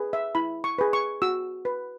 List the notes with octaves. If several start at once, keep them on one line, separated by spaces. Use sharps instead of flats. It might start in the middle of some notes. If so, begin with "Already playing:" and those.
Already playing: G#4 B4
E5
E4 B5
C#6
G#4 B4
C#6
F#4 E6
B4